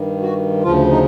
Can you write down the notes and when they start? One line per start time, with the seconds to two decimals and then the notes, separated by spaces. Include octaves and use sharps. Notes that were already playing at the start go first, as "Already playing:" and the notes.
Already playing: G2 D#3
0.22 F#4
0.63 D2 C#3 F3 F4
0.91 D#4